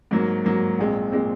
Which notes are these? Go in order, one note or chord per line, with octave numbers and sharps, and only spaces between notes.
G#2 F#3 A#3
G#2 F#3 A#3
A#1 A#2 G#3 C4
A#2 G#3 C4